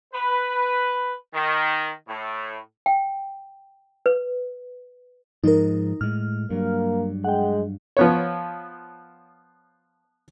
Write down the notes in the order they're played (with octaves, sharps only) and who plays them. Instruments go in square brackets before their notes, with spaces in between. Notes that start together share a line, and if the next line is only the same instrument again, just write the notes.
[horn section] B4
D#3
A2
[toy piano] G5
B4
[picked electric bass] G#2 F3 G#3 [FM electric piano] D#4 A#4
[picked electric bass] A2 G#3 [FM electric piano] F6
[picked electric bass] G2 F#3 [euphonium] A#3
[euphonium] G#3 [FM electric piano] F#5 G5
[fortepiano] F3 B3 C#5